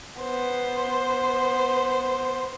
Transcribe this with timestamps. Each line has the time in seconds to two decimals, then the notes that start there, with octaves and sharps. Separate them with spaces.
0.20 B3 C5